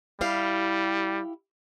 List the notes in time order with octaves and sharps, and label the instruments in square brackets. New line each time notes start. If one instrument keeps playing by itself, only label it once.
[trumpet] G3 [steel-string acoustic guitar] E4 G4 F5